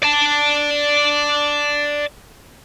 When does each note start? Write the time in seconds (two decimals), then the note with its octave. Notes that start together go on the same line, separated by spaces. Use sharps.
0.03 D5 A5